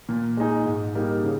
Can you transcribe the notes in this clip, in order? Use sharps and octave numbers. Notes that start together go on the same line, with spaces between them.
A#2
G#3 D#4 G#4
G#2
G3 A#3 D#4
C#3